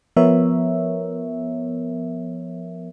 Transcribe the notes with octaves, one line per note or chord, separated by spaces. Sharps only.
F3 B3 A#4 C#5 E5